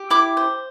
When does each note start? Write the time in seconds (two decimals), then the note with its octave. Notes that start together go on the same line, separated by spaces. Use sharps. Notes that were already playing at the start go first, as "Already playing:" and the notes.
Already playing: G4
0.10 E4 D6
0.37 C5